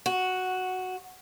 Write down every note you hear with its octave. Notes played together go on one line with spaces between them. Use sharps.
F#4